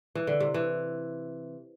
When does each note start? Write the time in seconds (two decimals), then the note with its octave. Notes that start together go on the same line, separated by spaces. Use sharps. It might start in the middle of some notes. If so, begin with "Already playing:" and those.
0.15 E3
0.27 D3
0.40 C3
0.54 E3